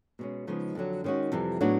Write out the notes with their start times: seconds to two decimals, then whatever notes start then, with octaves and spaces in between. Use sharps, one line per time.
0.19 B2 G#3 C#4
0.47 C#3 F3 G#3 B3 D#4
0.75 F2 D3 F#3
1.04 D#3 G#3 C#4 F#4
1.32 F2 C3 E3 G3
1.61 A2 F#3 B3 D4 F#4